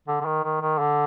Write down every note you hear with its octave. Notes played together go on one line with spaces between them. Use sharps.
D3
D3
D#3
D#3
D#3
D3